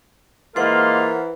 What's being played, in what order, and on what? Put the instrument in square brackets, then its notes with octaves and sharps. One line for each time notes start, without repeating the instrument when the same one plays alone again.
[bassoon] E3 [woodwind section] G#3 A#3 F4 [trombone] A#4 [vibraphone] C5 F#5